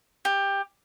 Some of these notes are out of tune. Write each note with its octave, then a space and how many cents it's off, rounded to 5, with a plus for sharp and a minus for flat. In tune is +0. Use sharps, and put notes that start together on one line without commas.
G4 +15